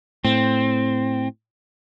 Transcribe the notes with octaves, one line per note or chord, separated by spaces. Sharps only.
A2 C4